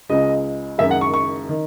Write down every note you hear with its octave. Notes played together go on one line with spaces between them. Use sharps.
C#2 C#3 G#3 D#5
F#1 F#2 D#3 G#3 E5
F#5
C#6
C#6
D#3